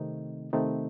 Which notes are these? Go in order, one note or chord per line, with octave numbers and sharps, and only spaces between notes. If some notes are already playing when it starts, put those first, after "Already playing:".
Already playing: C3 D#3 A3 C4 D#4
C3 D#3 A3 C4 D#4